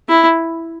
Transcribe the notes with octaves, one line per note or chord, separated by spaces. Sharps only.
E4